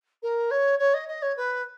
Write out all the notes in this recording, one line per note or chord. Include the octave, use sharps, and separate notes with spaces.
A#4
C#5
C#5
D#5
D#5
C#5
B4